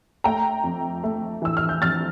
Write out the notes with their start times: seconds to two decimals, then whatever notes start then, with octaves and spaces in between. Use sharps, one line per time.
0.24 A3 G5 A#5
0.63 F2
1.04 A3
1.42 E3 E6
1.57 F6
1.69 G6
1.82 F2 F6 A6